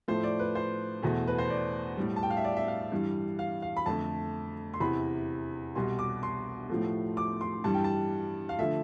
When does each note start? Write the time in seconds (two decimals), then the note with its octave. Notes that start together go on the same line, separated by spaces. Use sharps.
0.08 A2 F3 A3 C5
0.23 D5
0.39 B4
0.55 C5
1.02 E2 B2 A3
1.27 B4
1.38 C5
1.50 D5
1.97 A2 G3
2.16 A5
2.23 G5
2.30 F5
2.37 E5
2.44 D5
2.57 E5
2.68 F5
2.92 G2 E3 G3
3.39 F5
3.62 F5
3.77 B5
3.86 F2 D3 A3 A5
4.74 C6
4.80 E2 C3 E3 B5
5.75 C2 B2 G3 C6
5.99 D6
6.23 C6
6.69 A2 F3 A3
7.17 D6
7.41 C6
7.64 G2 E3 G3 A5
7.74 G5
7.84 A5
8.49 F5
8.59 D3 F3 A3 E5